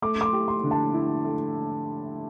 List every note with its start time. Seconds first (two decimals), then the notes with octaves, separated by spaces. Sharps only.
0.02 A3 D6
0.21 D6
0.25 C6
0.33 G4
0.48 C6
0.63 D3
0.71 A5
0.94 E4
1.25 A3